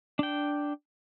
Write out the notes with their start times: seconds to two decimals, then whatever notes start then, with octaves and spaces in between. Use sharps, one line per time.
0.19 D4 G5